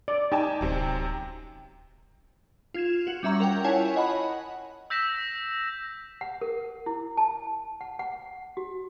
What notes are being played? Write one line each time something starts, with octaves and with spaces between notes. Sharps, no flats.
D5
D#4 G4 G#5 A5
D1 F#2 C3 C4
F4 G#6 E7
F#4
G3 C#4 E5 A#5 C#6
A#4 F#5 G5
E4 F4 C#5 F#5 G#5 A5
D#5 F#5 B5
E6 G6 A#6 B6 E7
F#5
A#4
E4
A5
F#5
F#5
F#4